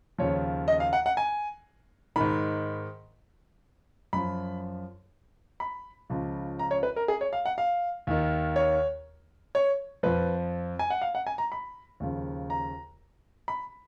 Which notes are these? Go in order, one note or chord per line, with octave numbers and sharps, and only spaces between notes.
D#2 C#3 F3 C#5
D#5
F5
F#5
F#5
G#5
G#2 D#3 B5
F#2 F3 B5
B5
C#2 C#3 F3
A#5
C#5
B4
A#4
G#4
C#5
F5
F#5
F5
D#2 D#3
C#5
C#5
F2 F3 B4
G#5
F#5
F5
F#5
G#5
A#5
B5
D#2 C#3 F3
A#5
B5